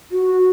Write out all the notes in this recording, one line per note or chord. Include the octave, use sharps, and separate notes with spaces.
F#4